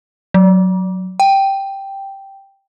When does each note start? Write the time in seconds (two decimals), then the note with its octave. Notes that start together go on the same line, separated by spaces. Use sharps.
0.34 F#3
1.20 G5